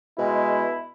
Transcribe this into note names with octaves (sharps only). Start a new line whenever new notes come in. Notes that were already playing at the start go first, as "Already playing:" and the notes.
B2 G#3 E4